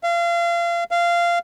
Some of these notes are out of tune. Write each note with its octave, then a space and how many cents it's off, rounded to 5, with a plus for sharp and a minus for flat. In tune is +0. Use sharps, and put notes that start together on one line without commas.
F5 -30
F5 -15